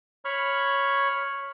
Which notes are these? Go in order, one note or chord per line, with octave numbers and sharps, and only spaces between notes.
C#5 B5 C#6 F6